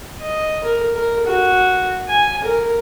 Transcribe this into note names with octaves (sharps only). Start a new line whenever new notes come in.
D#5
A#4
A#4
F#4
G#5
A#4